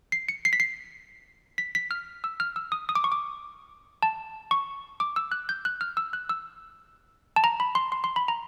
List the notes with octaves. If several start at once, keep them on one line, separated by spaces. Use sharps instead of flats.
C7
C#7
C7
B6
C7
B6
B6
F6
E6
F6
E6
D#6
D#6
D6
C#6
D6
A5
C#6
D6
E6
F#6
G6
F#6
F6
E6
F#6
E6
A5
A#5
B5
C6
C6
C6
B5
A#5